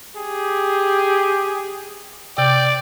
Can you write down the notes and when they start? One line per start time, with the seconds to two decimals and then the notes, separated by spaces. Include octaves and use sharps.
0.17 G4 G#4
2.38 C3 D5 G5